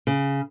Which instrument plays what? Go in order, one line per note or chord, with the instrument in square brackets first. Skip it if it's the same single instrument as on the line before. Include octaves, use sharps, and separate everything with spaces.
[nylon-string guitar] C#3